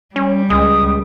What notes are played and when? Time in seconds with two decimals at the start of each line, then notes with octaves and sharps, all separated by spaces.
0.16 G3 C#4
0.50 C#2 G#3 D#6